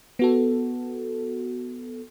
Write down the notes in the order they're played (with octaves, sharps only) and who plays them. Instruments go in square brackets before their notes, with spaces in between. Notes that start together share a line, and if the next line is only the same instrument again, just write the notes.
[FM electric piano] B3 F#4 A4